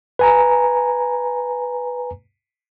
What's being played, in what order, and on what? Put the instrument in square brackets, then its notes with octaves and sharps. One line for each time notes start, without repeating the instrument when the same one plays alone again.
[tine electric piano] B4 G#5 A#5